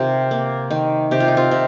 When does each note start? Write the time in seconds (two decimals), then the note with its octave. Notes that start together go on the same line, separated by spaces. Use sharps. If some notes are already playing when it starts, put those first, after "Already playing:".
Already playing: C3 D#3 F4 G4 A#4
0.31 A#3
0.71 D#3
1.11 C3 G4
1.20 F4
1.28 D#4
1.37 C4 F4
1.51 C3